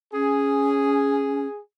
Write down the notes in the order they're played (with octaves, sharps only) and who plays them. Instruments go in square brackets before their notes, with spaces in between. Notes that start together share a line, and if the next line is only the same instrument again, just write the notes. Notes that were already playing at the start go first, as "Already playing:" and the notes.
[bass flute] C#4 [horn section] G#4